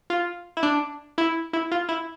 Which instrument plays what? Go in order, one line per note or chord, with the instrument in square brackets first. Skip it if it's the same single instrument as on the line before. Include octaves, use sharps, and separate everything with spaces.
[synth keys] F4
E4
D4
E4
E4
F4
E4